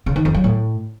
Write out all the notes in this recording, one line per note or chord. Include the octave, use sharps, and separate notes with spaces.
C#3
D#3
F2
F#3
A2